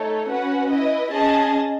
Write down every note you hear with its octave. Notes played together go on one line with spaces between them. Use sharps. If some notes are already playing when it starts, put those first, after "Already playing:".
Already playing: A3 D#4 A4 C#5
C#4 F#4 B4 F#5
E4 B4 D#5
C#4 G#4 D#5 A5